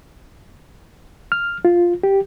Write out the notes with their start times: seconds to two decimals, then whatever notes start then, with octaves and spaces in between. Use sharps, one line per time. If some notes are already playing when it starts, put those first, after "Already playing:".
1.32 F6
1.65 F4
2.03 G4